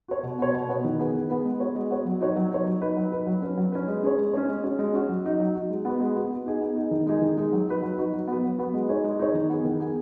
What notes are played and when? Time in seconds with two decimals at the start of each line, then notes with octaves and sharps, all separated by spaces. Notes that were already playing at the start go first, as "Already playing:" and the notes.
0.08 F#4 C#5
0.23 B2
0.39 B3 F#4 C#5
0.54 B2
0.69 B3 F#4 C#5
0.84 D#3
0.99 B3 G#4 B4
1.14 D#3
1.29 B3 G#4 B4
1.44 G#3
1.60 B3 F#4 C#5
1.75 G#3
1.91 B3 F#4 C#5
2.05 F#3
2.20 D#4 F#4 C#5
2.36 F#3
2.51 D#4 F#4 C#5
2.66 F#3
2.81 D#4 B4
2.97 F#3
3.12 D#4 B4
3.27 F#3
3.42 C#4 B4
3.57 F#3
3.72 C#4 B4
3.87 G#3
4.03 C#4 G#4 C#5
4.18 G#3
4.33 C#4 G#4 C#5
4.48 G#3
4.64 C#4 F#4
4.79 G#3
4.94 C#4 F#4
5.09 F#3
5.24 D#4 F#4
5.40 F#3
5.55 D#4 F#4
5.70 G#3
5.85 B3 F#4 B4
6.00 G#3
6.15 B3 F#4 B4
6.31 B3
6.46 D#4 G#4
6.61 B3
6.76 D#4 G#4
6.91 D#3
7.06 G#3 D#4 G#4
7.22 D#3
7.37 G#3 D#4 G#4
7.52 F#3
7.67 D#4 F#4 B4
7.82 F#3
7.98 D#4 F#4 B4
8.13 F#3
8.28 B3 F#4 B4
8.44 F#3
8.58 B3 F#4 B4
8.74 G#3
8.89 D#4 G#4 C#5
9.04 G#3
9.19 D#4 G#4 C#5
9.34 D#3
9.50 B3 G#4
9.65 D#3
9.80 B3 G#4